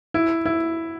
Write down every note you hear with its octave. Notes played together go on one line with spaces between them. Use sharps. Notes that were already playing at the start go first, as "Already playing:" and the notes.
E4
E4